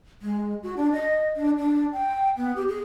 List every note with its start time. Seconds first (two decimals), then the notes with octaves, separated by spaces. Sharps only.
0.22 G#3
0.63 F#4
0.77 D4
0.92 D#5
1.36 D4
1.58 D4
1.92 G5
2.37 B3
2.56 G4
2.68 G#4